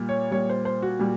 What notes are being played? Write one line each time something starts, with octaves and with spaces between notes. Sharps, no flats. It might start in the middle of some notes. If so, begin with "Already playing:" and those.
Already playing: A#2 G3
C#5
A#2 G3 C#5
C5
C5
F#4
A#2 G3